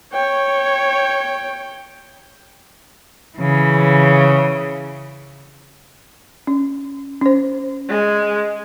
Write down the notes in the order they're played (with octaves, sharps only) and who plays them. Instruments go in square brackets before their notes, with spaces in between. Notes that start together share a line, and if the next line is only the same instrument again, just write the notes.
[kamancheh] C#5 [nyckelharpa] G5
[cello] C#3 E3
[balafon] C#4
C#4 C5
[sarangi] G#3